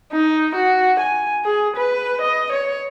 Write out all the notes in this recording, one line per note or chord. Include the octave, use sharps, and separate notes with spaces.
D#4
F#4
G#5
G#4
B4
D#5
C#5